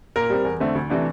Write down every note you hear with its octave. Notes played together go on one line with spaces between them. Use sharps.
A#2 A#4
G3 C4
E2
D3 A3 C4
D2
C3 E3 A3 D4